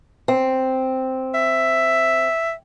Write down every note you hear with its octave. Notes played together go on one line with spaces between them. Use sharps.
C4
E5